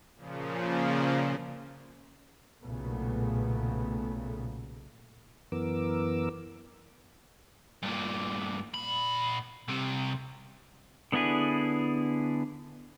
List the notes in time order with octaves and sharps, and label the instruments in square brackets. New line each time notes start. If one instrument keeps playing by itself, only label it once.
[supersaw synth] A#2 C#3 F3
[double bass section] B1 A#2 C#3 A3 B3
[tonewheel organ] F#2 E3 B3 A#4 D6 E6
[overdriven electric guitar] G2 A#2
A#2 B5
C2 C3
[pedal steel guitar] D3 B3 D4 E4 G#4